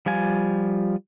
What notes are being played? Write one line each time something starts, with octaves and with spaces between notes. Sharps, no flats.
F3 G3 F4 G#5